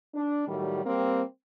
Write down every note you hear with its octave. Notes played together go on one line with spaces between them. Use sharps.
D4
A2 D#3 F#3 G3
G3 A#3 C4